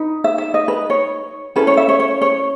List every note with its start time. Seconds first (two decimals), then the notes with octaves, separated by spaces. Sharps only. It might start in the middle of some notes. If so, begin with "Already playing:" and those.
Already playing: D#4 B4
0.24 E5
0.38 E5
0.54 D#5
0.68 B4
0.90 C#5
1.56 C#4 E4 A4 B4
1.67 C#5
1.77 E5
1.89 C#5
2.00 C#5
2.21 C#5